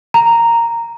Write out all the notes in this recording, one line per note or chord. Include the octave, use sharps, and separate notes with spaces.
A#5